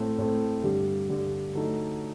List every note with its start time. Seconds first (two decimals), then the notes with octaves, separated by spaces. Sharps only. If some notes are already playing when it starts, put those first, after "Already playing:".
Already playing: A2 A3 C4
0.18 A2 A3 C4
0.63 G2 D3 G3
1.09 G2 D3 G3
1.54 D3 F#3 A3 D#4